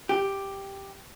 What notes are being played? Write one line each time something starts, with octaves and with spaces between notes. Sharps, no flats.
G4